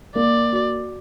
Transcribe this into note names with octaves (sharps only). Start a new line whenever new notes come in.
A#3 D5
F#4